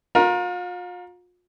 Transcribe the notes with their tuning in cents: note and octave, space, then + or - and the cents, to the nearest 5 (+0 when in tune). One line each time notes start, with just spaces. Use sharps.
F4 +40 A#4 +15